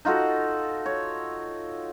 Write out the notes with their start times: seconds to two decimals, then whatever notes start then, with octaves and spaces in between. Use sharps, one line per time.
0.05 D#4 F4 F#4 A4
0.86 C#5